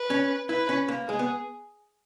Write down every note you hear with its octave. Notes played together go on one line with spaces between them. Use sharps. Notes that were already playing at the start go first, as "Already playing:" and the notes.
Already playing: B4
C#4
E4 B4
C#4
A#3
G#3 G#4
B3